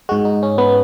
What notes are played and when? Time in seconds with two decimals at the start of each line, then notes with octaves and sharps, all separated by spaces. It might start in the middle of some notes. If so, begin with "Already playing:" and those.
0.09 G#2 G#3 F#4
0.25 D#4
0.43 C#4
0.58 B3